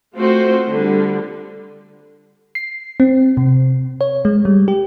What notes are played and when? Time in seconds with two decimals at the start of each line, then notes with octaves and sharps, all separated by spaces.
0.16 A3 C4 F4 F#4 C5
0.69 D3 G3
2.55 C7
3.00 C4
3.37 C3
4.01 C#5
4.25 G#3
4.45 G3
4.68 G4